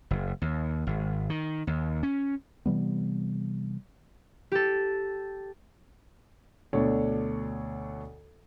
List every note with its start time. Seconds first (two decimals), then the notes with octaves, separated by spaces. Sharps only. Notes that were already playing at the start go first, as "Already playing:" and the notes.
0.11 F#1
0.42 D#2
0.87 G#1
1.30 D#3
1.67 D#2
2.03 C#4
2.66 C3 E3 G3 B3
4.52 G4 A4
6.73 D2 B2 D4 A4 C#5 D5